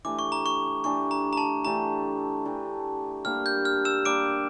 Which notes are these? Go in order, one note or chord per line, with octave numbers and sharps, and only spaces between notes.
E3 A3 D4 G4 D6
C#6
A#5
C#6
E3 A3 D4 G4 C#6
A#5
A#5
A5
E3 A3 D4 G4 A#5
E3 A3 D4 G4
G3 A#3 D4 G4 F6
G6
F6
E6 E7
G3 A#3 D4 G4 D6 D7